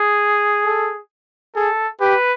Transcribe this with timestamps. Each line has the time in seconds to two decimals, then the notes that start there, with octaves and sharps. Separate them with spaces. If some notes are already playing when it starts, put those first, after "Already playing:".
Already playing: G#4
0.65 A4
1.55 G#4 A4
2.01 G4 B4